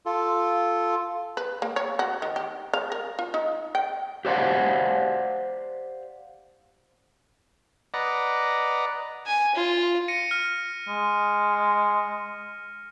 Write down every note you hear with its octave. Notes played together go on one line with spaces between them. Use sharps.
F4 A4
B4
A#3
C#5
F#4
D#3
G4
F5
A#4
F4
D#4
G5
G4 C5 D5 F5 F#5
B4 D5 D#5 F#5 A#5
G#5
F4
A#6 C#7 D#7
F6
G#3